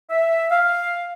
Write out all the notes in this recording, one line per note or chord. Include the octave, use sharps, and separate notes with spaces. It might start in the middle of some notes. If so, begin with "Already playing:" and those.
E5
F5